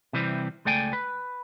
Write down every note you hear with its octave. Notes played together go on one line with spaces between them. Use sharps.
C3 E3 G3 C4
C#2 A3 D5 G5 G#5
B4